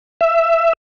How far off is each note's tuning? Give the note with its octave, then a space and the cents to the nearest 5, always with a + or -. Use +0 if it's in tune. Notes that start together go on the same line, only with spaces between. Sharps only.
E5 +15